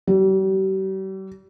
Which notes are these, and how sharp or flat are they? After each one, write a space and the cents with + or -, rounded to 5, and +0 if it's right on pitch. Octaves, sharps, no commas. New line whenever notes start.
G3 -40